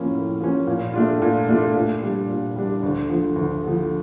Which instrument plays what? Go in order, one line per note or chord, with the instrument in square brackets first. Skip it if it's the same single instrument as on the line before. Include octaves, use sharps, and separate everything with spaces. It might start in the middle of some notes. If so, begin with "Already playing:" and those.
Already playing: [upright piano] A2 F3 A#3 C#4
A2
F3 A#3 C#4
A#2
A3 D4 F4
A#2
A3 D4 F4
A#2
G3 D4
A#2
G3 D4
D2
D3 F3
D2
D3 F3